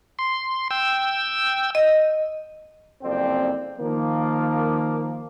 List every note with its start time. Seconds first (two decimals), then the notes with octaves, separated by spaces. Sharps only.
0.19 C6
0.71 G5 E6
1.75 D#5
3.03 F#1 F2 C4 D5 G5
3.79 D#3 F3 A#3